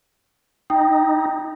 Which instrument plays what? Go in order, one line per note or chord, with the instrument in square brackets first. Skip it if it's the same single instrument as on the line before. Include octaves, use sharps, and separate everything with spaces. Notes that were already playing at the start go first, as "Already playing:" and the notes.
[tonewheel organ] D#4 [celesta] G5